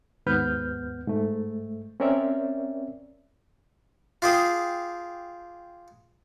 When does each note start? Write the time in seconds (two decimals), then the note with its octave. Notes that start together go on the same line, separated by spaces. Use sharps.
0.26 D#2 G#2 B3 B4 F6 G6
1.07 G#2 A3
2.00 C4 C#4 A#4 C#5 D5 E5
4.22 F4 G4 G#4